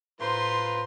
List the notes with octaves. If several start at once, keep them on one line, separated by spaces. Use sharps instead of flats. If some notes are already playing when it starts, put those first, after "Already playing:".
A2 F4 B4 C5 A#5 C6